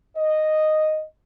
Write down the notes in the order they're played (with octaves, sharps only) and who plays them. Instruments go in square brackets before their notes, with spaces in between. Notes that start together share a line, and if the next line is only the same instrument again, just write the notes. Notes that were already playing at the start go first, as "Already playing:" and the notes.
[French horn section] D#5